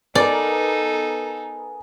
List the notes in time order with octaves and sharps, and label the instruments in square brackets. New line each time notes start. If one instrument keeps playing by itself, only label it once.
[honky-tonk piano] B3 A#4 [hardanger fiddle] D#4 A4 [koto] D5 [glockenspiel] G#5